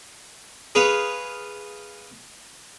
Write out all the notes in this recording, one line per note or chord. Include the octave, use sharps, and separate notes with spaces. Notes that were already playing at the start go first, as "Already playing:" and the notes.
G#4 B4 C#5 F5